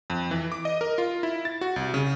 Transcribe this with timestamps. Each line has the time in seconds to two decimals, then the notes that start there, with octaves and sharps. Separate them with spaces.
0.10 F2
0.31 E3
0.52 D6
0.65 D#5
0.81 A#4
0.98 F4
1.23 E4
1.45 A6
1.61 F#4
1.76 C2
1.94 C#3